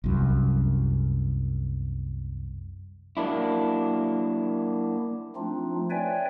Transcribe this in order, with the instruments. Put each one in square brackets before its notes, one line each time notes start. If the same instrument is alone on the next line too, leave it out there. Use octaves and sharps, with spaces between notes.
[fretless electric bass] C2 F#2
[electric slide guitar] F#3 A#3 D4 E4
[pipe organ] F3 A3 C4 D4 D#4 F4
B4 C#5 D5 E5 G5 G#5